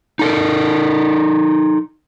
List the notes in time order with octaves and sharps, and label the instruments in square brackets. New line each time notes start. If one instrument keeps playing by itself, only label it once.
[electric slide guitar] D#4 A4 A#4